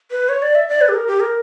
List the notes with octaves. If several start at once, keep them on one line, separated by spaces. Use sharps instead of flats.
B4
C#5
D5
E5
D5
B4
G4
A#4
G4
A#4